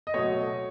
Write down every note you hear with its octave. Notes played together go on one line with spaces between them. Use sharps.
D#5
B2 F#3 A3 C#5